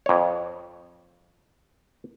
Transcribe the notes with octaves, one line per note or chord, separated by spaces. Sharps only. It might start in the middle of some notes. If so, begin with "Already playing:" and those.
F2 C#5